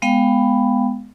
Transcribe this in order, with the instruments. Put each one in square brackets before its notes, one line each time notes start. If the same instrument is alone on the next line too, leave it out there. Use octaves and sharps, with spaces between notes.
[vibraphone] G#3 B3 F5 G5 B5